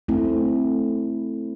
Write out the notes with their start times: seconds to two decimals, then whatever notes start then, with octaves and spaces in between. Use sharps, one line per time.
0.08 A3 C4 E4